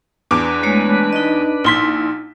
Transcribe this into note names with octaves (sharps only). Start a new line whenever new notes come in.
E2 D4 B4 D6
G#3 A3 C#5
D#4 D#5
A#1 D#4 E4 C6 B6